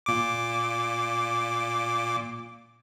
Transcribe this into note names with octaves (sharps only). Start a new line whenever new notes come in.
A#2 D6